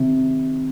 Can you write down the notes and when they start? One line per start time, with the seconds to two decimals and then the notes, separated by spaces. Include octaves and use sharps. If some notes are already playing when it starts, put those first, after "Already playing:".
Already playing: C3 D#3